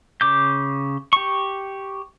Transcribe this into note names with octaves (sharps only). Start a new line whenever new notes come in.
C#3 D6 G6
G4 C#6